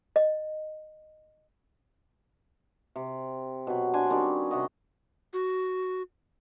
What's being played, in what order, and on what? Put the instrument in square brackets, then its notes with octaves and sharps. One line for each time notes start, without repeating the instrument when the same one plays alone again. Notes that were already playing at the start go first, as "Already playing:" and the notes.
[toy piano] D#5
[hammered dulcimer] C3
B2 F#3
D4 C5 D5 G#5
D#3 G3 C4 C#4
C3 F#4 D#5
[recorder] F#4